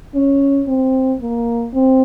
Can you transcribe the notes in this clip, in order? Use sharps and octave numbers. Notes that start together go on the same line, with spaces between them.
C#4
C4
A#3
C4